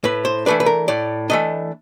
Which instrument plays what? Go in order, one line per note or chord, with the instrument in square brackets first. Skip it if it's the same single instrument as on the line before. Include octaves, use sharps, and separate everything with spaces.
[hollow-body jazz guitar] A2 B4
C5
E3 A3 D4 B4
B4
A#4
A2 D5
E3 A3 D4 D#5